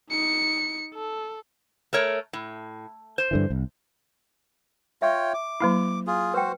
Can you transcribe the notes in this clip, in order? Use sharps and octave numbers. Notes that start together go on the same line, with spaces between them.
D#4 C#7
A4
A3 A#4 C#5
A2
C5
G2 D3 E3
C2
F4 C#5 E5 G5 C#6
D6
F#3 A#3 E4
F4 G#4
F#4 B4 C5 G5